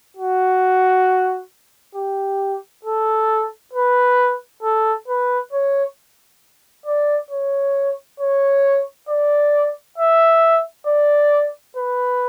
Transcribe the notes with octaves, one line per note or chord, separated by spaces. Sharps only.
F#4
G4
A4
B4
A4
B4
C#5
D5
C#5
C#5
D5
E5
D5
B4